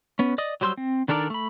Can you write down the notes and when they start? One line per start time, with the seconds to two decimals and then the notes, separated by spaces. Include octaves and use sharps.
0.19 B3 C#4
0.38 D5 D#5 D#6
0.61 F#3 G3 C5 C6 E6
0.77 C4
1.08 D#3 D4 A4 A#4 D5
1.30 A3 B5